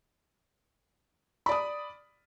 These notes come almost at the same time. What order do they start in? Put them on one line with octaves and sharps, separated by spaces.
B5 D5 D#6